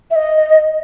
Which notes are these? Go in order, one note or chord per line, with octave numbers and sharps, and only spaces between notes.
E5
D#5